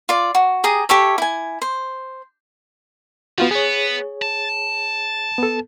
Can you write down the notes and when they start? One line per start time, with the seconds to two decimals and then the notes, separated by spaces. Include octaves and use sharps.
0.09 F4 D5
0.35 F#4
0.64 G4 G#4 A#5 D#6
0.89 G4 A4 C#5 E5
1.18 E4 G#5
1.62 C5
3.38 F3 B3 F4 F#4
3.51 B3 G#4 C#5
4.22 A5
5.38 B3 A4